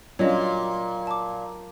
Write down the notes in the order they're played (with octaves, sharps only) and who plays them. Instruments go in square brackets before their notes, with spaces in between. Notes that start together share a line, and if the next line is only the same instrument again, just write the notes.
[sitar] A#2 [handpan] F#3 F4 [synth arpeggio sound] G3 C#4 D4 [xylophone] C#5 D#5
[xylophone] A5 D6